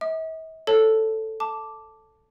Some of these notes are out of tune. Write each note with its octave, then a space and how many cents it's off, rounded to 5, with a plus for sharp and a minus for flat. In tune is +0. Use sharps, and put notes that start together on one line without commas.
E5 -45 D#6 -40
A4 +0 C#5 +0 A5 +0
A5 +0 D6 +0